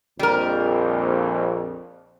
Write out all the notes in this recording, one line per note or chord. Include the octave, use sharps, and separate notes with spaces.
A#1 F2 G3 A#4